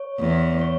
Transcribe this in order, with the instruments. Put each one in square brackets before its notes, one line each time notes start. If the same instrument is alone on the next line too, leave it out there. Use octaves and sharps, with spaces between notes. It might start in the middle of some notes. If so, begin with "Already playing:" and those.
Already playing: [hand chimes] C#5
[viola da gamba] E2
[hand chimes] C#5